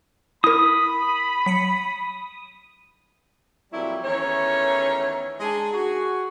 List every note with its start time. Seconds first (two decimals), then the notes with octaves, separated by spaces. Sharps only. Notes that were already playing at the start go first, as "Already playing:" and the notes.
0.44 E4 A#4 B5 D#6
1.46 F#3 B6 C#7
3.73 F2 A#2 F#3 G3 E4
4.03 E2 D#3 E3 A3 C#4 C#5
5.40 G#3 D4 D#4 G#4
5.74 F#4 G#4